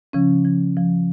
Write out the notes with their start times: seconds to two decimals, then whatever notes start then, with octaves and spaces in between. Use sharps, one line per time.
0.13 C#3 F3 C#4
0.45 F3
0.77 F3